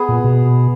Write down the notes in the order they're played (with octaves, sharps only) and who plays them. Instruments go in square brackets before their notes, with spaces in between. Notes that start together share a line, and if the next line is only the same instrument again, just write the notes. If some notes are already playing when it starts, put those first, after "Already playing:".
Already playing: [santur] B3 G#4
[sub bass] A#2
B2